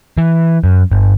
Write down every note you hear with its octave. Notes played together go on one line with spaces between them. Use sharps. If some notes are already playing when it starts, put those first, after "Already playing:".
E3
F#2
G1